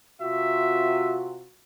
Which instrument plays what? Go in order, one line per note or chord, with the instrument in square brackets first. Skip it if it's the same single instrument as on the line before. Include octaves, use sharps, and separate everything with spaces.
[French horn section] C3 F4 F#4 [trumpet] E5